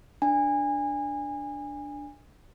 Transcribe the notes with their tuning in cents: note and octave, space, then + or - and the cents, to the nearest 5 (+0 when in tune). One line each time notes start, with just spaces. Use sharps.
D4 +0 G#5 -25